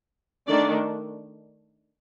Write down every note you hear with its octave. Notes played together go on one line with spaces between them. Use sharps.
D#3 A3 D4 D5